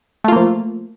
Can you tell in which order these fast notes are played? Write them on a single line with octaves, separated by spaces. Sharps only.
A3 F4 A#3 F3